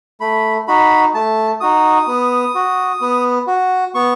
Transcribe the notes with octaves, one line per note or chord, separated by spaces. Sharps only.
A3 B5
D#4 F#4 B5
A3 A5
D#4 F#4 D#6
B3
F#4
B3
F#4
B3 C#6